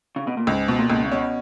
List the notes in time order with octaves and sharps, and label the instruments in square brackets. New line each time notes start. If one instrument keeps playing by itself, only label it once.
[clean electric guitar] C#3
B2
A#2
[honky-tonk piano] C#2 [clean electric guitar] G#2
[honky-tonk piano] B2
[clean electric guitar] A#2
[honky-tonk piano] C#2
[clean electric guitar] C#3
[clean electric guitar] B2 [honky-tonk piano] C#4